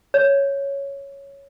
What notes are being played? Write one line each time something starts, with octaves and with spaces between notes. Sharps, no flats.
C#5